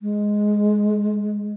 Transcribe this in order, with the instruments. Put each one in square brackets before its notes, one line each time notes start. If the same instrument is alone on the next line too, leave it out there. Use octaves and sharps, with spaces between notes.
[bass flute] G#3